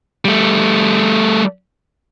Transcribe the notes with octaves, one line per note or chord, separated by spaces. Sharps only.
G3 A3